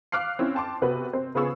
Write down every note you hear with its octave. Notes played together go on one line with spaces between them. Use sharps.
F5 D6 F6 F#6 C7
C4 C#4 E4
G5 A5 C6 D6
C3 B3 F#4 B4
C4 C5
C#3 B3 F4 G#4 C#6 E6